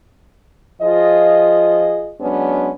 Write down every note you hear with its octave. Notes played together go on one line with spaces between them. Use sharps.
F3 F4 G#4 D#5
F#3 G#3 B3 C#4 D4